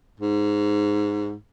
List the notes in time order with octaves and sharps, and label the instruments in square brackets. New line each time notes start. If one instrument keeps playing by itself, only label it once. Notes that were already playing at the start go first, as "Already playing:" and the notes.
[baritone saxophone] G#2